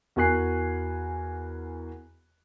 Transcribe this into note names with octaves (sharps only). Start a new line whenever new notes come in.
E2 F#4 A#4 G#5 F#6 C7